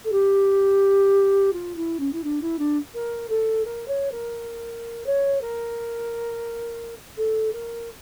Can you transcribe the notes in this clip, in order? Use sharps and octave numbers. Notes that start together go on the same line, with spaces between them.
A4
G4
F4
E4
C#4
E4
D4
E4
D4
A#4
A4
A#4
C#5
A#4
C#5
A#4
A4
A#4